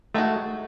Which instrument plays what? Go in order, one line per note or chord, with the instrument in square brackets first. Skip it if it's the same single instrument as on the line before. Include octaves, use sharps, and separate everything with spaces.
[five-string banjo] D#3 G#3 B3 D#4 F#4 [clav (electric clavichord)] A3